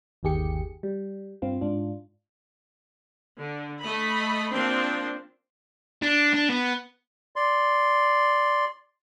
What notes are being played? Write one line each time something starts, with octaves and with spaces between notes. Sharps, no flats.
G1 D#2 D#3 G4 G#4 C#7
G3
G2 C4 F4
G#2 D4 F4
D3
A3 D#5 B5
F3 A#3 C4 D4 C6
D4
D4
B3
D5 C6